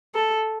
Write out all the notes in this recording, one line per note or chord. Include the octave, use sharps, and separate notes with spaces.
A4